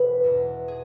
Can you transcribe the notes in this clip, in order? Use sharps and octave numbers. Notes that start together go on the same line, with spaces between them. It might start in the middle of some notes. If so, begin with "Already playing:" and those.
Already playing: E1 B4
E2 B2
G#4